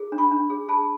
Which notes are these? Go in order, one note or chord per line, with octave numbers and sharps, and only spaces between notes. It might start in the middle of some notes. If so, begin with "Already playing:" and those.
Already playing: G#4
D4
B5 C#6
D4
G#4
G#4 A5 B5